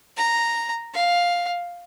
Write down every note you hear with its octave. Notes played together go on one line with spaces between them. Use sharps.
A#5
F5